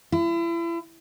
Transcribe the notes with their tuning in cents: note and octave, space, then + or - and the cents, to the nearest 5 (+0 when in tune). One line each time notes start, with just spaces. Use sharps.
E4 +35